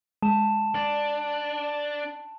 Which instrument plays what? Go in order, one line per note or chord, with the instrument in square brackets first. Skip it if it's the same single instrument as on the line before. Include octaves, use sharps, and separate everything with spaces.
[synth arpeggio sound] G#3 [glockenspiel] A5 E7
[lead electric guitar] D4